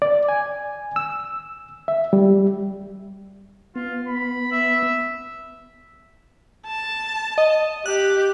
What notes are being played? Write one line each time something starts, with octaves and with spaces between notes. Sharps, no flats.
D5
G#5
E6
E5
G3
B3 F4
B5
E5
A5
D#5
G4 F#6